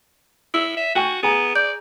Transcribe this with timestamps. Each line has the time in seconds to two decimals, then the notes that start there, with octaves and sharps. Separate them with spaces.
0.54 E4 E6
0.77 E5
0.95 F#4 G5 G#5 C#6
1.23 B3 G#4 G#5 A#5
1.55 D5 G6